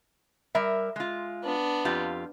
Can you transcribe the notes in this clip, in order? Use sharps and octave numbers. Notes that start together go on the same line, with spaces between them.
G3 A#4 E5
G#3 F4
B3 D4
F2 F4 G4